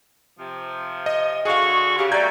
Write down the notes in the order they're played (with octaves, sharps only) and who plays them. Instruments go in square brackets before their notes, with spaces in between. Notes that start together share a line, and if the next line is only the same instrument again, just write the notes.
[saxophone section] C3 F3
[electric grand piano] D#5
[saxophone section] D3 F#4 [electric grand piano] G#4 F5 [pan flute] C#6
[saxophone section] C#3 [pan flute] G4
[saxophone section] F#3 G3 A3 [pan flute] D5 [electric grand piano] A#5 G6 G#6